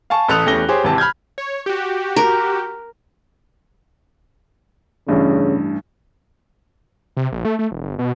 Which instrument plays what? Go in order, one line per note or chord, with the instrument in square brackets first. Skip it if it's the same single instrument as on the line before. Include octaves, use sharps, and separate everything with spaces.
[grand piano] F5 G#5 A5 C#6
A1 A3 A4 D#6 F#6 F7
E2 A3 C#4 G4 A#6 G7
G4 G#4 C5 C#5
G#1 C3 E3 G4 A5
B5 F6 G6 G#6
[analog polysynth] C#5
F#4 G4
[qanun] A#4
[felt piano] A1 G2 [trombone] C#3
[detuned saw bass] C3
A#1
A3
A3
E1
G1
B2